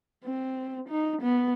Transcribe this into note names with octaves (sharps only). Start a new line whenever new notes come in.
C4
D#4
B3